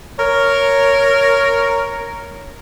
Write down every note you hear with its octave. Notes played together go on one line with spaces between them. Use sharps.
A#4 C#5